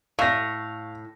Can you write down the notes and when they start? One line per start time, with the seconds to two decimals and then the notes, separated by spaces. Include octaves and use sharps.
0.19 A2 F5 C#6 A#6